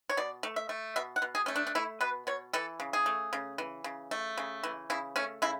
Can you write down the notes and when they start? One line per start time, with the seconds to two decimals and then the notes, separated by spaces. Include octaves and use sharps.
0.09 C#5
0.17 B2 D5
0.43 A3
0.56 E5
0.69 A3
0.96 B2 E5
1.16 F#5
1.22 B2
1.35 G#4
1.46 A3 C#4
1.56 D4
1.67 D4
1.75 A3 E4
2.01 B2 B4
2.27 B2 C#5
2.53 E3 A4
2.80 C#3
2.93 G#4
3.06 A3
3.33 C#3
3.58 E3
3.84 C#3
4.11 A3
4.38 C#3
4.63 E3
4.90 C#3 E4
5.16 A3 C#4
5.42 C#3 E4